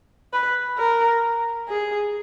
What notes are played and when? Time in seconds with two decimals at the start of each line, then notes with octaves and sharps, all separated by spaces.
0.33 B4
0.78 A#4
1.68 G#4